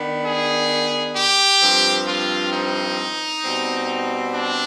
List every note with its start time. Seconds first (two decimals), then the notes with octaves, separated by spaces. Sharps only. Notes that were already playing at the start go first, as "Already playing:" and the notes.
Already playing: D#3 B3 D4
0.25 G#4
1.15 G4
1.61 G2 F3 C4
2.07 F4
2.52 D#4
3.43 B2 G3 C4
4.34 D4